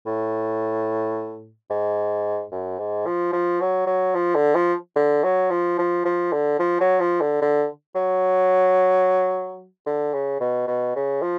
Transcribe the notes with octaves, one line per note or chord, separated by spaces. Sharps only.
A2
G#2
F#2
G#2
F3
F3
F#3
F#3
F3
D3
F3
D3
F#3
F3
F3
F3
D3
F3
F#3
F3
D3
D3
F#3
D3
C#3
B2
B2
C#3
F3